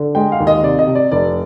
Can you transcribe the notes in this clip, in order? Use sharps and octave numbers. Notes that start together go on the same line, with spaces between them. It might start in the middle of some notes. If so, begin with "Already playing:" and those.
Already playing: D3
G#3 G5
F5
D#2
D#5
C3 D5
D#5
C3
D5
F1 D5